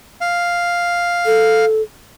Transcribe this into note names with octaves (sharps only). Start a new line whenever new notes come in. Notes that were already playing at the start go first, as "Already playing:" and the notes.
F5
A4